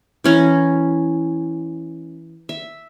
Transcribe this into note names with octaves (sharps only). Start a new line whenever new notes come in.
E3 C#4 A#5
E5